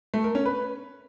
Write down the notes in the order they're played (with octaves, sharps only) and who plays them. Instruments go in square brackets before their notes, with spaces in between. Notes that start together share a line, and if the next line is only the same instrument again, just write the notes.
[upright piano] A3
A#4
C#4
B4